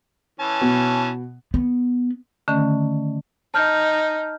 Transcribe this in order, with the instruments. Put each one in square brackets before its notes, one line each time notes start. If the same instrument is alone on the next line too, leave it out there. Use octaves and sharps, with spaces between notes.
[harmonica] E3 C#4 A5
[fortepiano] B2
[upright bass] B3
[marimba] D3 D#3 A3 C#4
[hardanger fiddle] D#4 [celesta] A5 F6 G6